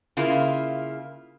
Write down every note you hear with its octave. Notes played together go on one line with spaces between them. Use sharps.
C#3 A#3 E4 F4